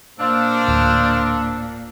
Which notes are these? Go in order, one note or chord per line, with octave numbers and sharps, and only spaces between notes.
A#2 D4 C5 F5 E6
D1